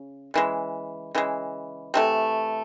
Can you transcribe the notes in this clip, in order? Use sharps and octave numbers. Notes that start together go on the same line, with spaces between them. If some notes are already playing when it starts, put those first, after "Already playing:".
Already playing: C#3
C#3 E3 G#3
C#3 E3 G#3
C3 E3 A3